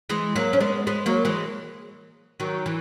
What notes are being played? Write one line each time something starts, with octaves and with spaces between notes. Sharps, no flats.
E3 G#3
F#3 A#3
C#4
G#3 B3
G#3 B3
F#3 A#3
E3 G#3
D#3 F#3
E3